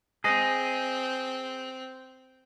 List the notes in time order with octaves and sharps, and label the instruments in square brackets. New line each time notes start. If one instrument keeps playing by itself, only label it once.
[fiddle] C4 [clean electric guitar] G#4 D#5